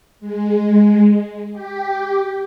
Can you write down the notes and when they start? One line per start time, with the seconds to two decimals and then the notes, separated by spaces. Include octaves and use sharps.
0.20 G#3
1.53 G4